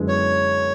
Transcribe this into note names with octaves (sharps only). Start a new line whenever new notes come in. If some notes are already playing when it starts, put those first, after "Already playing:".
Already playing: F#2 D3 G#3 B3 E4
C#5